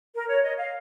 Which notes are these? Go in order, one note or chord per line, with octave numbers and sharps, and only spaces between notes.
A#4
C#5
D#5
F5